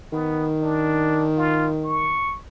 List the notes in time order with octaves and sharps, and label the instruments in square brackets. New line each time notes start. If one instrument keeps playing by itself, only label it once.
[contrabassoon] D#3 [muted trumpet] B3
[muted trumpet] D4
F4
C#6